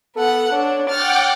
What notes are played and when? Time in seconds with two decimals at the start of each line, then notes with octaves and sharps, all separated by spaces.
0.16 B3 A4 F#5
0.52 D4 C#5
0.89 F#5 G5 D6 F6 A6